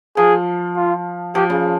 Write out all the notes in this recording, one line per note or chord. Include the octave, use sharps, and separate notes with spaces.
F3 G#4
F4
F3 G4
C#3